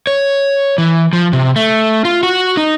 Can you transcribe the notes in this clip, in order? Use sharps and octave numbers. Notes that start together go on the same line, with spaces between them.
C#5
E3
F3
C3
A3
F4
F#4
D#4